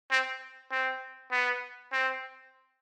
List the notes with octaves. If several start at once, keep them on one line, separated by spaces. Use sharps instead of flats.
C4
C4
B3
C4